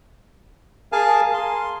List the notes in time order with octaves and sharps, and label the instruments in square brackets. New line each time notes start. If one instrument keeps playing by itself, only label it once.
[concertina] G#4 A#4 F5 G#5 A5
C6